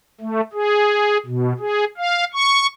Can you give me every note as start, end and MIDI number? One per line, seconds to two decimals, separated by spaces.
0.21 0.41 57
0.53 1.18 68
1.26 1.53 47
1.59 1.85 68
1.97 2.24 77
2.33 2.67 85